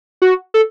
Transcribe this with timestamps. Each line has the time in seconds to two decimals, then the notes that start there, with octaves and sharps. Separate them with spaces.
0.22 F#4
0.54 A4